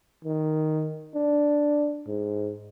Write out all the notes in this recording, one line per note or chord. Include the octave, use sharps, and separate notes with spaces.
D#3
D4
G#2